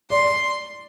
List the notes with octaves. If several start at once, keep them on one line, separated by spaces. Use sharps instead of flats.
D5 C6